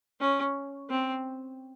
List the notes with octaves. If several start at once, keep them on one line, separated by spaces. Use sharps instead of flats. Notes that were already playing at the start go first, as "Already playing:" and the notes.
C#4
C4